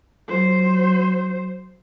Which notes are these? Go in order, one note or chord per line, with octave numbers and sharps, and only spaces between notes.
F#3 C5